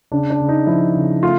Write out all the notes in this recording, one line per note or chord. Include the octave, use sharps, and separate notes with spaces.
C#3 D4
D4
C#3
D#4
F3 E4
C#3
A3 F4